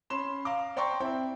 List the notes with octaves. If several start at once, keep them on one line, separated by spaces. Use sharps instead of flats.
C#4 B5 C6 E7
F5 A#5 D6
C5 D5 G5 A#5 C6 C#6
C4 E4 G5